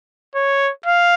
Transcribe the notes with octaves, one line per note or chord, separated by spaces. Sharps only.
C#5
F5